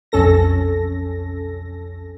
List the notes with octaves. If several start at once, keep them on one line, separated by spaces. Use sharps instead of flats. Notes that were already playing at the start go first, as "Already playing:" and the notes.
B1 F2 C#4 A4 A#6